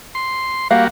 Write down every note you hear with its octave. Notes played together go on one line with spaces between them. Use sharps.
C6
G3 A#3 F#4 F5